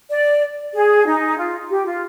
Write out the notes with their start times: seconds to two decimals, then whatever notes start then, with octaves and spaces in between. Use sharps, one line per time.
0.11 D5
0.74 G#4
1.05 D#4
1.38 F4
1.70 G4
1.86 F4